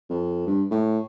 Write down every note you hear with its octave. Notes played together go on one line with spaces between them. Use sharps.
F2
G2
A2